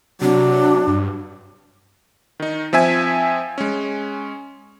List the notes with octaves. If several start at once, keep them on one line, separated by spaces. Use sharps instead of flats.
C3 F#3 D4 F#4
G2
D#3 D#4
F3 C4 E5 G#5 G#6
G#3 C#4